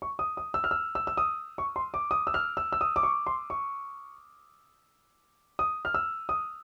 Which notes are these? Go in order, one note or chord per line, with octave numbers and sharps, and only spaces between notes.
C#6
D#6
D#6
E6
F6
E6
E6
E6
D#6
C#6
C6
D6
D#6
E6
F6
E6
E6
D#6
D6
C#6
C6
C#6
D#6
F6
E6
D#6